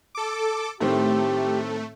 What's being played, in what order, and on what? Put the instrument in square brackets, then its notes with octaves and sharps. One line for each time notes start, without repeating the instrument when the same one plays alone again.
[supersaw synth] A4 D6
[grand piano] A2 D#3 C4 [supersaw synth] A3 [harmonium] G4